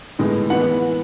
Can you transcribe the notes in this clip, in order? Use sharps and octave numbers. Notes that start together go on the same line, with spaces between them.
A2 G#3 B3
E3 B3 F#5